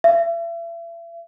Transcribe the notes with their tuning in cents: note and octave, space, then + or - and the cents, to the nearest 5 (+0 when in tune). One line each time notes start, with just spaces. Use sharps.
E5 +40